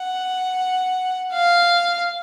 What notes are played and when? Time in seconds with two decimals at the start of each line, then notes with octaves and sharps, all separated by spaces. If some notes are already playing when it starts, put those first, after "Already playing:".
Already playing: F#5
1.33 F5